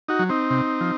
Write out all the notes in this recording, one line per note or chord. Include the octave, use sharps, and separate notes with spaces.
D#4 F#4
F#3
C4 D#4
C3
F3